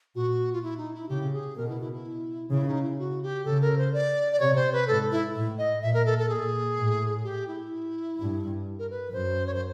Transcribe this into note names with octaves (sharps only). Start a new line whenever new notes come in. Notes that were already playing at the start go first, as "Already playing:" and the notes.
A#2 F#4
F4
E4
D#4
E4
C#3 G4
G#4
B2 A#4
E4
E4
E4
C#3 E4
D#4
E4
F#4
G4
C#3 A4
A#4
C5
D5
D5
C3 C#5
C5
B4
G#2 A4
E4
A2
D#5
A#2 E5
A#4
A4
A4
A#2 G#4
A2
G4
E4
G2
A#4
B4
F#2 C5
C#5
C5